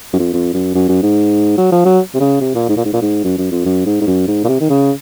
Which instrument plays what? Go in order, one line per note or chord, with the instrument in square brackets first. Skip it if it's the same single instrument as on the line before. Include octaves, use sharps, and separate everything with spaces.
[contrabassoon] F#2
F2
F2
F#2
F#2
F#2
G#2
F#3
F3
F#3
C3
C#3
C3
A#2
G#2
A#2
G#2
A#2
G#2
F#2
F#2
F2
F#2
G#2
G#2
F#2
G#2
A#2
C3
D#3
C#3